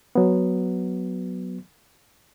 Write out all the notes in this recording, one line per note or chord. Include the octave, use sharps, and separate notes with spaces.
F#3 B3